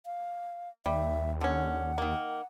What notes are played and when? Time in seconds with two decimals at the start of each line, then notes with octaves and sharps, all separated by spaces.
0.06 F5
0.86 D#2 G3 E5
1.41 D3 C#4 F#5
1.98 D#3 A#3